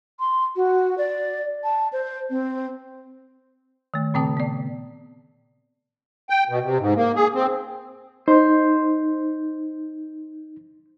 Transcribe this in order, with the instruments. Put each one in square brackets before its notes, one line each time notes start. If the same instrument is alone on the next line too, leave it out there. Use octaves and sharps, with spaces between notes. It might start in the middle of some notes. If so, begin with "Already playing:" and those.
[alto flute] C6
F#4
D5
A5
C5
C4
[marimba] D#3 A3
A#2 C#3 C4 G5 A5 D#6
B3 D5
[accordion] G5
B2
C3
G#2
A#3
G#4
C4
[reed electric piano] D#4 [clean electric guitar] C5